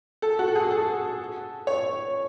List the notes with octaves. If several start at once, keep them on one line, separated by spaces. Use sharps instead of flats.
A4
F#4
A4
G#4
A4
C#5